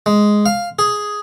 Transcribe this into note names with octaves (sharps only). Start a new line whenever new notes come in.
G#3
F5
G#4